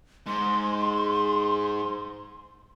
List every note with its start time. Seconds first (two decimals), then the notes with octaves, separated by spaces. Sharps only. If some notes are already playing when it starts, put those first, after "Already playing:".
0.27 G#2 C6